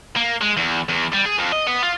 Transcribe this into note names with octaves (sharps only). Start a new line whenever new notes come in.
A#3
G#3
E2
E2
G3
G#4
F2
D#5
B3
F4